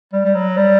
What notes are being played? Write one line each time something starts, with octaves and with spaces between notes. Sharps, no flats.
G3
G3
F#3
G3